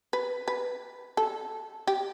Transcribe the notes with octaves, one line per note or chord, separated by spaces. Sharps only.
B4
B4
A4
G4